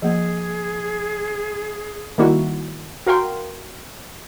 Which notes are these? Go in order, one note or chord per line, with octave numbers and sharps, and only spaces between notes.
F3 A#3 G#4
D#3 G3 A#3 E4 F#4
F#4 A#4 F5 G5 C6